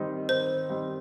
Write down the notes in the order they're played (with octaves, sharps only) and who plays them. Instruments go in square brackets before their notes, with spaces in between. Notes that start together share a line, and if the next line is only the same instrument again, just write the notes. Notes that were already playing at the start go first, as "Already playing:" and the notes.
Already playing: [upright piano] D#3 G3 C4 D#4
[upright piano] D#3 [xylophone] C5
[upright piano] G3 C4 D#4